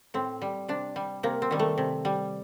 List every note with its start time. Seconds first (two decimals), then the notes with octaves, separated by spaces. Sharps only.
0.14 A2 C4
0.42 G3
0.68 C3 D4
0.96 G3
1.23 C3 A#3
1.42 C4
1.51 D#3 G3
1.59 A3
1.78 C3
2.05 G3